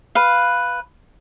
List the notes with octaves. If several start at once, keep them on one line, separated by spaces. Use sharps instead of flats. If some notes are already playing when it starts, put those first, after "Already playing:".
B4 F5